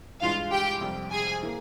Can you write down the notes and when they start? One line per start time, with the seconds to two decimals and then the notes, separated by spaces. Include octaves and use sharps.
0.22 G2 E3 G#3 F4 F5
0.51 G4 G5
0.81 F2 C3 G3
1.11 G#4 G#5
1.43 E3 A#3